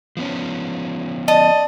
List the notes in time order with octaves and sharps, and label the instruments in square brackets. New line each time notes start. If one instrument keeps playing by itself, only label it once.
[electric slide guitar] F3 B3 C#4
[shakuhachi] D5 [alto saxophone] D#5 [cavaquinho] A5